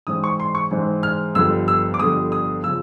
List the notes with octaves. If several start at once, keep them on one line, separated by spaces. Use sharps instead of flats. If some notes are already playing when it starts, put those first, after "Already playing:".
G#2 E3 G#3 C4 D#6
C#6
C6
C#6
G#2 E3 G#3 C4
F6
G1 F2 D3 G3 E6
E6
D6
G1 F2 D3 G3 D#6
D#6
C#3 F3 E6